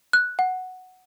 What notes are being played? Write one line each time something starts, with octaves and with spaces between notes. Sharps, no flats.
F#6
F#5